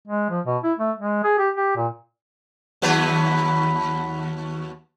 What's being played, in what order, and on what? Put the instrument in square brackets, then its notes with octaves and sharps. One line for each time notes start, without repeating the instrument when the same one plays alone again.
[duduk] G#3
F3
B2
E4
A3
G#3
G#4
G4
G4
A#2
[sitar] D#2 F#3 B3